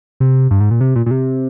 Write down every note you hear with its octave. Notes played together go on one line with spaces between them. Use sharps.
C3
G2
G#2
A#2
C3
A#2
A#2
C3